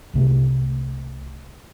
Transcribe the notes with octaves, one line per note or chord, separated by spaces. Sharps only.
C2 C3 A3